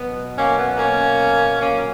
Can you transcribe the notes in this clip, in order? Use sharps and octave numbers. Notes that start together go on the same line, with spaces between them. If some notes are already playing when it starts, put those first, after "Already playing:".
Already playing: B2 F#3 B3
A#3 C#4
B3
A#3 C#4
A#2 F#3 A#3 C#4